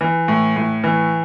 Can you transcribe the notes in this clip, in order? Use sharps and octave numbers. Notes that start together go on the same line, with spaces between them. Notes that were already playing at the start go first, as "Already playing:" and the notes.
E3
A2
A2
E3